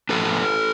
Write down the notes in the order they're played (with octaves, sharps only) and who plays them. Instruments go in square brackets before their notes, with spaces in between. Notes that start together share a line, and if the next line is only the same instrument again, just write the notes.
[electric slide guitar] A2 F3 A#3 D4 A4 B4